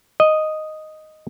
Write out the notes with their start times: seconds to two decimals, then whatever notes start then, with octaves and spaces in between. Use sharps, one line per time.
0.20 D#5